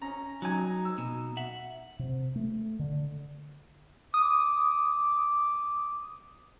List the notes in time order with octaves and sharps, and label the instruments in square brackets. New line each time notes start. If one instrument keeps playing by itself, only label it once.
[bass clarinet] C#4 [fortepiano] A#5
[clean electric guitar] F#3 [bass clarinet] D#4 [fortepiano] G#5 A#5
[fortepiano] E6
[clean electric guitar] B2
E5 F#5
[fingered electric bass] C3
A3
D3
[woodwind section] D6 [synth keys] D#6